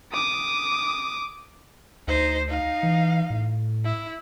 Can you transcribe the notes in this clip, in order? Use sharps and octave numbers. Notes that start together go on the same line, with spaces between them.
D6 D#6
D2 D#4 C5
D#4 F5
E3
A2
E4